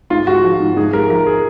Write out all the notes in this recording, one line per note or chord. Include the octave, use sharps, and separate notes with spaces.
G#2 F4
G#3 F#4
F3
G#2
G#2 G#4
G#3 A#4
F3 A#4
G#4